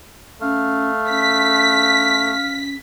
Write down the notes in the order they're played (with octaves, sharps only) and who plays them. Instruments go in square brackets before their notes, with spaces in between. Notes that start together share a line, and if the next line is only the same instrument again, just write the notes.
[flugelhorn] A3 [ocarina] C#4 [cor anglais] F5
[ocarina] C#4 [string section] B6